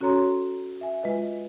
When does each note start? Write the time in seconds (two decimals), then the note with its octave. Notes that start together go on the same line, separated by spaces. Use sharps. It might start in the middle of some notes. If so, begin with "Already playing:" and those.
0.01 C#4 F#4 A4 C#5 A#5 C6
0.81 E5 G#5
1.03 G#3 F4 B4 D#5